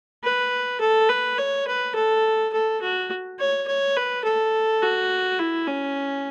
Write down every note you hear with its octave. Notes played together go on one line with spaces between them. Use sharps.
B4
A4
B4
C#5
B4
A4
A4
F#4
C#5
C#5
B4
A4
F#4
E4
C#4